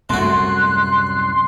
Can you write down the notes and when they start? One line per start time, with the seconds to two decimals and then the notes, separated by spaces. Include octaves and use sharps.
0.10 C2 F#2 A2 A3 F#4 C6 F#6